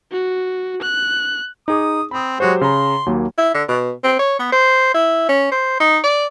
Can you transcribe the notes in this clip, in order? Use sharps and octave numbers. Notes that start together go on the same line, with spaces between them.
F#4
F#6
D#4 G#4 D6 D#6
C4 B5 D#6
F#3 G#3 F#4 G4 C5 C#5
C#3 A#5 C6
D#2 F#3 A#3
E4
D3
B2
C4
C#5
B3
C5
E4
C#4
C5
D#4
D5